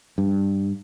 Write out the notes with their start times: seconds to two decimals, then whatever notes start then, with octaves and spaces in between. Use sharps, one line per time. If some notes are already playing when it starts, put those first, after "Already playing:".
0.18 G2